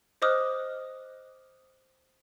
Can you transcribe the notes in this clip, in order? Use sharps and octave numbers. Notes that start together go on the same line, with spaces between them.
C5 D#5 D6 D#6 F6 F#6